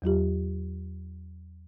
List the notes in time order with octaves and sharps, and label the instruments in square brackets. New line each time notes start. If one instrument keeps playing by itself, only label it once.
[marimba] E2 F#3 F4 G4